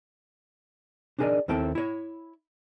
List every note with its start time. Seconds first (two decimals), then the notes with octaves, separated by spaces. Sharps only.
1.19 D4 D#4 G#4 A#4 D5 D#5
1.48 D#2 D#3 C4 E4 A4 G5
1.75 E4 C#5